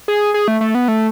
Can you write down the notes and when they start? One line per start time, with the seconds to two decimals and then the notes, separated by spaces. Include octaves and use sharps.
0.08 G#4
0.34 G#4
0.48 A3
0.61 A3
0.75 B3
0.88 A3